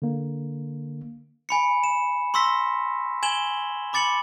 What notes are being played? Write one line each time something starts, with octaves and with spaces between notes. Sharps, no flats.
D3 A#3
G#5 B5 C#7
E7
C6 C#6 E6 A#6 B6
G#5 G#6 E7 F#7 G7
B5 D6 A6 C#7 F#7